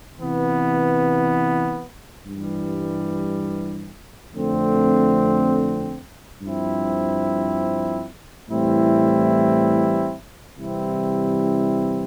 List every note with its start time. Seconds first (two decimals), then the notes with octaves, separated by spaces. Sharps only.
0.19 C3 E3 B3
2.26 G2 E3 G3
4.33 F2 D3 A3 C4
6.41 G2 F3 C4 E4
8.50 A2 E3 G3 C4 E4
10.57 C3 E3 G3 C4 E4